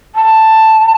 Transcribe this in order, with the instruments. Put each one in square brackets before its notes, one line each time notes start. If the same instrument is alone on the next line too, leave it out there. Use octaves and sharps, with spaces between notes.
[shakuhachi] A5